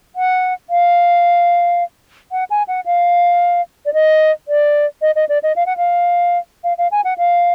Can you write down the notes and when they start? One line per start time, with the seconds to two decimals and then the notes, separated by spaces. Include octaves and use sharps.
0.16 F#5
0.70 F5
2.32 F#5
2.50 G#5
2.68 F#5
2.86 F5
3.86 D5
3.93 D#5
4.48 D5
5.02 D#5
5.16 D#5
5.29 D5
5.43 D#5
5.56 F5
5.66 F#5
5.77 F5
6.64 F5
6.78 F5
6.91 G#5
7.04 F#5
7.18 F5